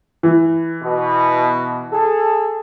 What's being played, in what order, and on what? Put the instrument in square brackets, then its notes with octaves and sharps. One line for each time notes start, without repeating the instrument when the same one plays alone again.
[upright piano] E3
[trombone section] B2
G#4 A4